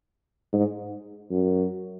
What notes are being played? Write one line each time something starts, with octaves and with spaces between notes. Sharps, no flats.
G#2
F#2